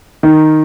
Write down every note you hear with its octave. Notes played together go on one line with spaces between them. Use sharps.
D#3